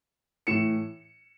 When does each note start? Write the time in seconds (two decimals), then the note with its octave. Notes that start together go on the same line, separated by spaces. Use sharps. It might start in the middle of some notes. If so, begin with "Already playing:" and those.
0.47 A2 E3 C#7 E7